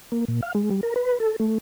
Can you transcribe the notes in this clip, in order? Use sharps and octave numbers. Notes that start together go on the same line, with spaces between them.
A#3
A#2
F5
G#3
G3
A#4
B4
A4
A3